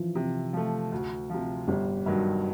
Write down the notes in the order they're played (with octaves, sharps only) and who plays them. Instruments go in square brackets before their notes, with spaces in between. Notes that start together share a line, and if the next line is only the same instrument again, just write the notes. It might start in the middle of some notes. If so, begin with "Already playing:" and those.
Already playing: [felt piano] E3 F3
[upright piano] C3
F3 A3
D2
C3 F3
[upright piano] G1 [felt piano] G3
[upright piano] G2 D#3 F#3